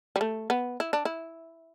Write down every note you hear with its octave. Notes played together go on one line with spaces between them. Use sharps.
G3
A3
B3
E4
D4
E4